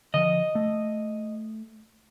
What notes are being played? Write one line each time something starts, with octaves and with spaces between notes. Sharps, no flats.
D3 F3 D#5
A3